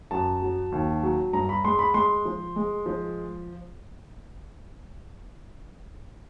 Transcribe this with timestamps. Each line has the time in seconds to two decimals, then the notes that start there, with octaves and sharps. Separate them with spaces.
0.11 F#2 A5
0.42 F#3
0.72 D#2
1.03 F#3
1.33 G2 A#5
1.49 B5
1.65 G#3 C6
1.79 B5
1.94 G#3 C6
2.25 F3
2.56 G#3
2.86 F3